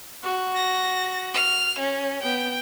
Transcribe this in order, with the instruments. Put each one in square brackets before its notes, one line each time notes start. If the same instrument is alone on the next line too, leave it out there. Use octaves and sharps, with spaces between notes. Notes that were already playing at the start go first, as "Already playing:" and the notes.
[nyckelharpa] F#4
[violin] A#6
F6
C#4
[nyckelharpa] B3 [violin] G5